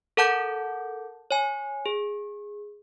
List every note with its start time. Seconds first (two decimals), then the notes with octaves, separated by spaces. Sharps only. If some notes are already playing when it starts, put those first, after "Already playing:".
0.17 A4 A#4 F#5 A5 D6 G6
1.31 C#5 G#5
1.86 G#4